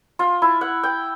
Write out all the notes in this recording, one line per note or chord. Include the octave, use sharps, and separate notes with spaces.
F4
E4
F#5
G5